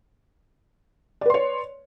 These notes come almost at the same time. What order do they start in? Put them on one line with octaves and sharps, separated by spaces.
D5 B4 C6 C#5